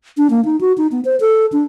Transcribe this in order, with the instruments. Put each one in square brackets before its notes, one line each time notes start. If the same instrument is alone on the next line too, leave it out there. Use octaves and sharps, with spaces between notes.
[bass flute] D4
A#3
D#4
F#4
D#4
B3
C5
A4
D4